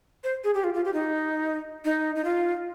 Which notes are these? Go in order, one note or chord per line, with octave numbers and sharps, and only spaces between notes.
C5
G#4
G4
F4
F4
G4
D#4
D#4
D#4
F4